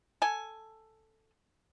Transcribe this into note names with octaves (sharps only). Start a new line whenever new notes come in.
A4 G#5